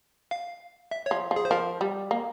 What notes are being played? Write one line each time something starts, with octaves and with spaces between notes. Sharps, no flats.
F5
E5
F3 C#5
F3
G#4
C5
F3 A#4
G3
A#3